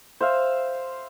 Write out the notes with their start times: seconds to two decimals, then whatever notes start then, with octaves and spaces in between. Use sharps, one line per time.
0.21 C5 E5 F5